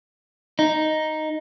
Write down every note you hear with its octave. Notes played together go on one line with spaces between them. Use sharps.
D#4